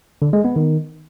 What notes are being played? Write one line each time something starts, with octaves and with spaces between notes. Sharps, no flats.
D3
G#3
B3
D#3